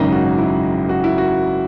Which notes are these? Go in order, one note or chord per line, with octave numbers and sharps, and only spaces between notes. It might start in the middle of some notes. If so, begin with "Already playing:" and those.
Already playing: G#1 F#2 C#3 D#4
F#4
E4
F#4
E4
F#4